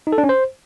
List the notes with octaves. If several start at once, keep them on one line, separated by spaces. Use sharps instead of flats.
D#4
A4
D4
C#4
C5